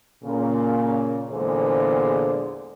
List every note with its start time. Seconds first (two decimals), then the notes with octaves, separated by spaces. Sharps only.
0.23 A#2 C#3 A#3
1.29 E2 A#2 D3 G#3 G#4 C5